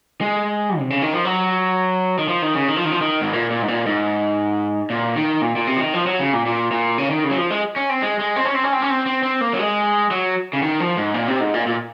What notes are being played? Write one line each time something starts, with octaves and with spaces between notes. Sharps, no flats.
G#3
C3
C#3
D#3
F3
F#3
D#3
F3
D#3
C#3
D#3
F3
D#3
F3
D#3
G#2
A#2
A#2
G#2
A#2
G#2
A#2
D#3
A#2
A#2
C3
F3
D#3
F3
F#3
C#3
A#2
A#2
A#2
C#3
D#3
C#3
F#3
F3
G#3
C#4
C4
G#3
G#3
C4
C#4
C4
C#4
C4
C#4
C4
C4
C4
A#3
F#3
G#3
F#3
C#3
D#3
F3
G#2
A#2
C3
G#2
A#2
A#2